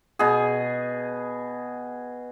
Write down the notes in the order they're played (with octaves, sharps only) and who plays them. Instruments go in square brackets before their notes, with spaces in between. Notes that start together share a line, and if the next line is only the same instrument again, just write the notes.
[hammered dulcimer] B2 G#4